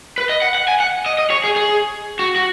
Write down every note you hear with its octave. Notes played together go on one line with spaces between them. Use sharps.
B4
D#5
F#5
F#5
G#5
F#5
D#5
D#5
C#5
G#4
G#4
F#4
F#4